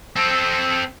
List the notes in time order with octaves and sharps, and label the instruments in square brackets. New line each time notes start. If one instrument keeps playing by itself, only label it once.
[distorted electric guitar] C4 A4